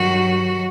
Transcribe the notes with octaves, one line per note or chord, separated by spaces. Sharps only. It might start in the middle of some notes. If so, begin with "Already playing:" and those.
Already playing: G2 D#3 F#3 F#4